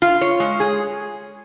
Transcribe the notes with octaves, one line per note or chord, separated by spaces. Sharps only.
F4
C#5
G#3
G#4